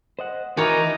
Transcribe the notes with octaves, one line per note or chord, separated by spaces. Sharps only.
C5 D#5 F#5
D#3 E3 D#4 F#4 A#4 C#5 D5 G#5